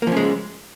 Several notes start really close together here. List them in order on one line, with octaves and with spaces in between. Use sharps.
A#3 F3 C#4 G#3